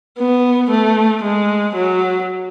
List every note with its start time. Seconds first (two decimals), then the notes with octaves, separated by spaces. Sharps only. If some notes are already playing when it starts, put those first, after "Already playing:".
0.19 B3
0.71 A3
1.24 G#3
1.75 F#3